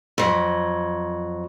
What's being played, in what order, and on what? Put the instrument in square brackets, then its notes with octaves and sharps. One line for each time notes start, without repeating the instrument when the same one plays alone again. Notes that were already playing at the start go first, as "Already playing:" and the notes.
[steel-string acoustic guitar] F2 F#3